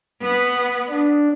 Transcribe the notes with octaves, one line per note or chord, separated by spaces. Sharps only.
B3
D4